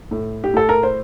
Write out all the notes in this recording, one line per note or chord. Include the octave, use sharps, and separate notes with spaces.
A2
G4
A2 A4
A#4
C5